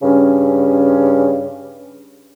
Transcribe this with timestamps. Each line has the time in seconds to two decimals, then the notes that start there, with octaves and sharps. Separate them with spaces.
0.02 G2 C#3 C#4